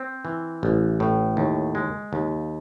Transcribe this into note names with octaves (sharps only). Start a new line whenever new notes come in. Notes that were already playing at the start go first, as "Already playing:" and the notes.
Already playing: C4
E3
A1
A2
D#2
G#3
D#2